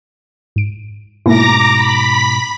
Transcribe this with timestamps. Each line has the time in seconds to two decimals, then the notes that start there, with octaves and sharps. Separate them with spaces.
0.56 G#2 D7
1.26 G#2 B2 A3 A#3 E4 A#5 D6 A#6
1.73 B5 B6